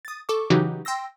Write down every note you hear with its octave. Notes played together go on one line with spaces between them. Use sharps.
D#6 A6
A4 C#6 D6
C#3 E3 F#3 D#4 F#4 G4
G5 C6 E6 A#6